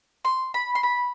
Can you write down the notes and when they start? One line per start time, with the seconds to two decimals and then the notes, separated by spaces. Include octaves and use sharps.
0.25 C6
0.54 B5
0.75 C6
0.83 B5